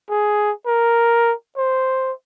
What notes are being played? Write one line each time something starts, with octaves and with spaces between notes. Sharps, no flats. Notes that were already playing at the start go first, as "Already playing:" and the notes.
G#4
A#4
C5